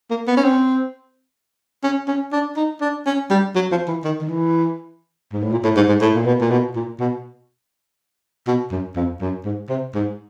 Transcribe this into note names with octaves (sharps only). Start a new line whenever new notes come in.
A#3
B3
C#4
C4
C#4
C#4
D4
D#4
D4
C#4
G3
F#3
F3
E3
D#3
D#3
E3
G#2
A2
A#2
A2
G#2
G#2
A2
A#2
B2
A#2
B2
A#2
B2
B2
F#2
F2
F#2
G#2
C3
G#2